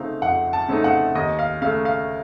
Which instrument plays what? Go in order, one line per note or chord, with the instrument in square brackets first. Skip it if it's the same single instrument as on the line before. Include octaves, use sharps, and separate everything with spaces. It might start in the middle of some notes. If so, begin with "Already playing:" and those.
Already playing: [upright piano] C#3 A3 C4 D#4 F5
F2 F#5
A5
C#3 A3 C4 D#4
F#5
D#2 D#5
F5
C#3 A3 F5
F5